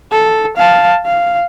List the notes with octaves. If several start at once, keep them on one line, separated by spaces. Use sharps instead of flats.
A4
F5 A5
F5